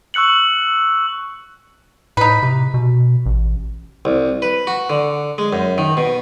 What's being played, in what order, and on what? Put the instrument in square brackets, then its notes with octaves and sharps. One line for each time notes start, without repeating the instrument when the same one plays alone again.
[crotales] C#6 E6 F#6 C#7 F#7
[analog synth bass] A2 [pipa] D#4 B4
[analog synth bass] C3
B2
A1
[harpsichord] C2
B4
F#4
D3
G#3
F#2
D#3
B2